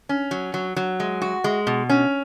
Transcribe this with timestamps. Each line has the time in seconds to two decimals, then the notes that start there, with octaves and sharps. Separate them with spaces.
0.09 C#4
0.31 F#3
0.54 F#3
0.76 F#3
1.00 G#3
1.22 F#4
1.44 G#3
1.67 B2
1.89 C#4